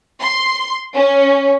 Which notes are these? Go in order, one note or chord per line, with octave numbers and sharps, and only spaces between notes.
C6
C#4